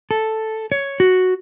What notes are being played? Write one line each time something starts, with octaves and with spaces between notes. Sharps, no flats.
A4
C#5
F#4